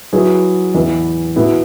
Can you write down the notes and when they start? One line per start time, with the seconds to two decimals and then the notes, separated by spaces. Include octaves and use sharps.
0.13 F#3 E4 G#4 B4
0.74 E2 E3 B3
1.36 B2 B3 E4